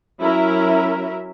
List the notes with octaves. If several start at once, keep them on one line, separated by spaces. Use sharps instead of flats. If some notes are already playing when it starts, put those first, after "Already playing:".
F#3 C#4 E4 A#4 E5